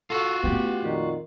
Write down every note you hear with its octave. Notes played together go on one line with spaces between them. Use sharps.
F4 F#4 A4
A3 B3 C#4 G4
F2 A#2 D#3